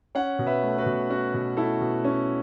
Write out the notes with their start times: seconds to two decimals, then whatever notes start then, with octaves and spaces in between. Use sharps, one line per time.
0.15 C#4 C#5 F#5
0.39 B2
0.46 B4 E5
0.63 A3
0.78 F#4 B4
0.86 B2
1.09 C#4 F#4
1.34 B2
1.57 A3 E4 A4
1.81 B2
2.04 C#4